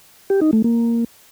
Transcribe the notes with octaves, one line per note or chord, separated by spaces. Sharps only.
G4
D#4
A3
A#3